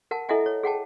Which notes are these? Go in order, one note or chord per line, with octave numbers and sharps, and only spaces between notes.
A#4 F#5 A5
E4 A4 D#5 E5 F#5 G#5
C#5
G#4 F#5 G5 A5